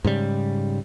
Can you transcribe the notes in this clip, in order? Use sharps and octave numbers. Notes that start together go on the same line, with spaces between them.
G#2 C#3 G3